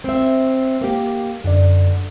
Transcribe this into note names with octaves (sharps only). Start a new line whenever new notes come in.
C4 E5
A#3 G4
F#2 D3 D5